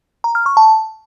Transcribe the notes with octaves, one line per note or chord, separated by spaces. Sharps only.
A#5
F6
C#6
A5